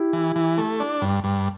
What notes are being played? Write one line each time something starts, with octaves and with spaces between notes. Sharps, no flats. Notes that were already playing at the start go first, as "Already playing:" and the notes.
Already playing: E4 G4
E3
E3
A3
D4
G2
G2